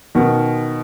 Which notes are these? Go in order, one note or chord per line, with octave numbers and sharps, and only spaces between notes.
B2 D#3